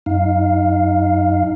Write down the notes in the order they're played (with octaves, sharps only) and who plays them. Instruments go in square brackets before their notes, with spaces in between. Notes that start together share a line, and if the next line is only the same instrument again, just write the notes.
[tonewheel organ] F#2 D#4 F5